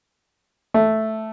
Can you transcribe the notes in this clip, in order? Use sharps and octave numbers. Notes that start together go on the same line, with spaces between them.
A3